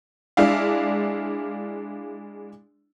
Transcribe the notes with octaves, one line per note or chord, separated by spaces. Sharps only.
G#3 D4 E4 D5 F5